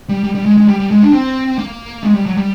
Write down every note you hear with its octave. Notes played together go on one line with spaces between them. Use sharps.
G3
G3
G3
G#3
G#3
G3
G3
G#3
D4
C4
A#3
G#3
G3
F#3
G3